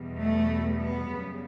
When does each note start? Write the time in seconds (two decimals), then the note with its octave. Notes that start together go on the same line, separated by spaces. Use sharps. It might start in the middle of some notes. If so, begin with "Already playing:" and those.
Already playing: E2 B2 G3
0.19 A3
0.77 B3
1.08 F#2 C#3 G3